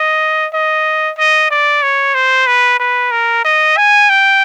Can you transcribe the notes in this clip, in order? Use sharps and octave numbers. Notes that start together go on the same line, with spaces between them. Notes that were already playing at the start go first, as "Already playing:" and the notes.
Already playing: D#5
D#5
D#5
D5
C#5
C5
B4
B4
A#4
D#5
G#5
G5